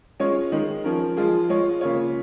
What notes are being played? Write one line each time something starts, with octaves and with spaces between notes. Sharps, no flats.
G#3 C#4 F4 C#5
D#3 G#3 D#4
F3 C#4 A#4
F3 G#3 F4 G#4
G#3 F4 C#5
C#3 A#3 F4 C#5